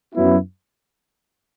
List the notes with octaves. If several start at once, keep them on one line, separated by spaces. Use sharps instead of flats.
F#2 F#3 B3 E4